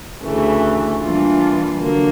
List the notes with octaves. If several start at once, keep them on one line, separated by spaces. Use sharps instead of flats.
D2 C#3 E3 A3
E3 G3 A#3 D4 F4
D3 F#3 A#3